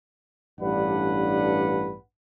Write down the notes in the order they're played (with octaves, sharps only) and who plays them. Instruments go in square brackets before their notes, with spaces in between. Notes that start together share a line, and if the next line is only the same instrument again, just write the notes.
[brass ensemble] A1 G2 D4 B4 F#5